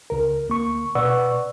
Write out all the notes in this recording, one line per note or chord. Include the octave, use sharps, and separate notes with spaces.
C#2 A#4
D2 A#3 C#6
B2 B4 D5 F#5 C#6 E6